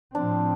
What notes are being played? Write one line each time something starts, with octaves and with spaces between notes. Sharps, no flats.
A2 F3 C4 D4